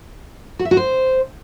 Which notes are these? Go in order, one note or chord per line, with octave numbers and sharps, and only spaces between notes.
F#4
E5
F#4
C5